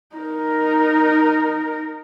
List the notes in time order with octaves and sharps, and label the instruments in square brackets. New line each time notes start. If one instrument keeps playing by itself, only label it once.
[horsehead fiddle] D#4 A#4